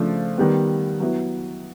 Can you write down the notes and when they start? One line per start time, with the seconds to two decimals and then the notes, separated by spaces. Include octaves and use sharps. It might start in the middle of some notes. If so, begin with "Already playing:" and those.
Already playing: C#3 F3 A3 D4
0.38 D#3 G3 B3
1.00 F#3 B3 E4